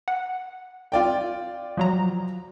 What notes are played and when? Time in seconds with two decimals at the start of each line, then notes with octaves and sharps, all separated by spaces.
0.08 F#5
0.92 F4 D5 G5
1.77 F3 F#3 A#5